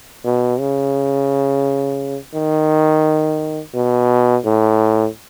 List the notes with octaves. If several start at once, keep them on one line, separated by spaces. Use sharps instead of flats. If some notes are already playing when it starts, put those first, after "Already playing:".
B2
C#3
D#3
B2
A2